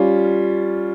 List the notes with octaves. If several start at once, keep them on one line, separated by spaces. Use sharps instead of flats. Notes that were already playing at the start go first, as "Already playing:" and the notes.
Already playing: G3 C#4 F4